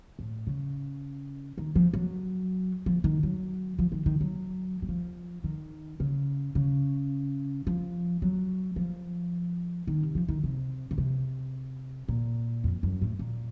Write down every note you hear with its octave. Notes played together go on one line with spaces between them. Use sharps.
A2
C#3
D#3
F3
F#3
F3
D#3
F#3
F3
D#3
D#3
F#3
F#3
F3
D#3
C#3
C#3
F3
F#3
F3
D#3
C3
F3
D#3
C3
C#3
C3
A#2
F2
F#2
A2
A#2